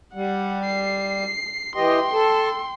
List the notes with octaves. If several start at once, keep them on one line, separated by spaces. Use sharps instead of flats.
G3 F#5
C7
E3 G4 D#5 G5 C6
A4